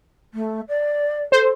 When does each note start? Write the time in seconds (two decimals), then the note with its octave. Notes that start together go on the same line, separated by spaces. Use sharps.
0.34 A3
0.69 D5
1.32 A4 C5